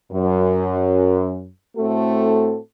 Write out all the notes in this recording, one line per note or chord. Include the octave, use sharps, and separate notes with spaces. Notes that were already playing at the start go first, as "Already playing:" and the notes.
F#2
A2 A3 C4 F#4 A4